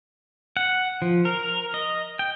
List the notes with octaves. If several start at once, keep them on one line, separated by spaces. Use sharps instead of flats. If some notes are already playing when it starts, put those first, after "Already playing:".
F#5
F3
A#4
D#5
G5